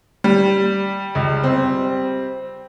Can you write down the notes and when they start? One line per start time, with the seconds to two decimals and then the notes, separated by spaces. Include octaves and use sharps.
0.24 G3
1.15 C#2
1.43 C4